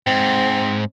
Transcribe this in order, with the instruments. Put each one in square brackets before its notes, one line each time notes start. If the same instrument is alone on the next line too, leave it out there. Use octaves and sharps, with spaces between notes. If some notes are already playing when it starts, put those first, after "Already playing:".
[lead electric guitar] G#2 [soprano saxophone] C4